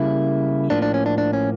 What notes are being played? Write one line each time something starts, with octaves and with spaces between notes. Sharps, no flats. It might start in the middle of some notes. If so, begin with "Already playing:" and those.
Already playing: C#3 G3 A#3 E4
A2 F3 A#3 D4
D4
C#4
D4
D4
C#4